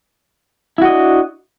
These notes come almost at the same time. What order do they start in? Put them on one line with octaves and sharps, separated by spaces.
E4 F#4 D#5 D4